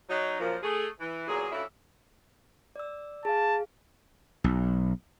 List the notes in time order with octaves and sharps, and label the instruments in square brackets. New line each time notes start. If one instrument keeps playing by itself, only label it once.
[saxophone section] F#3 D#4
F#2 A#2 F3
A3 G#4
E3
E2 A#2 F#3 G#4
D2 E3 C#4 E4 F4 E5
[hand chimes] D5 E6
[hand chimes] G#4 F5 [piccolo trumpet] A5
[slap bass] B1